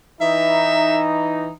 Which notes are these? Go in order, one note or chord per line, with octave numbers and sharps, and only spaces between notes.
E3 D#4 E5